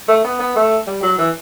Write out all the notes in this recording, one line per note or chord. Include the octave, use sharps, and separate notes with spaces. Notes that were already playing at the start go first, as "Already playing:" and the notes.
A3
B3
B3
A3
G3
F#3
E3